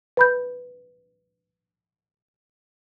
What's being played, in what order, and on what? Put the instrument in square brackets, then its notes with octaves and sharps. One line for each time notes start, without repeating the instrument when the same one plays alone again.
[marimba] B4 B5 G6